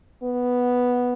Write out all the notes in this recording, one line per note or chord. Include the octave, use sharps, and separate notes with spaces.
B3